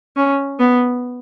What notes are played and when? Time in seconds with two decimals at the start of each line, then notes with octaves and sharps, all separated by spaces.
0.17 C#4
0.60 B3